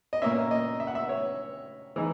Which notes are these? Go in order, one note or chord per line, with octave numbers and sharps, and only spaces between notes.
D#5
A#2 A#3 C#4 E5
D#5
E5
F#5
E5
C#5
E3 G#3 D#4